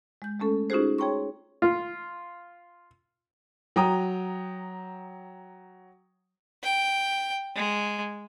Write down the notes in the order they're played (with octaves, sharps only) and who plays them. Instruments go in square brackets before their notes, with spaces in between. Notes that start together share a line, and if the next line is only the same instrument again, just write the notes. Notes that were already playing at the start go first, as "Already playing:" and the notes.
[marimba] G#3 G6
G#3 A3 C#4 A4
C#4 D#4 F4 F#4 G#4 C5
G#4 C#5 G5 A#5 C6 C#6
[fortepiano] F4
[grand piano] F#3 G5 A#5 D#6
[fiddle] G5
G#3